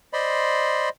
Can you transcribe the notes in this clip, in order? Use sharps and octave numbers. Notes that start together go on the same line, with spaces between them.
C5 D5 D#5 B5 C6